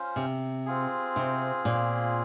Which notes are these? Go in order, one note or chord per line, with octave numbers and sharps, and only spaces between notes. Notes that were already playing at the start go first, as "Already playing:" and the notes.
Already playing: C#4 F4 C5
C3
C4 F4 G#4
C3
A#2